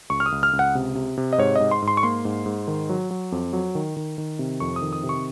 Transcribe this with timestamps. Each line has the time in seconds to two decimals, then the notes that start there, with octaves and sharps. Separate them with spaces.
0.10 C#2 C#6
0.20 F6
0.26 D#6
0.32 C#2
0.43 F6
0.53 C#2
0.59 F#5
0.75 C3
0.95 C3
1.17 C3
1.33 D#5
1.38 G#2 C#5
1.56 G#2 D#5
1.71 C6
1.82 G#2
1.88 C6
1.97 C#6
2.03 A#3 C6
2.25 G#2
2.46 G#2
2.68 D#3
2.89 F#3
3.11 F#3
3.32 F2
3.53 F#3
3.75 D#3
3.97 D#3
4.18 D#3
4.39 C3
4.60 F2 C#6
4.76 D#6
4.82 D#3
4.93 D#6
5.03 C3
5.09 C#6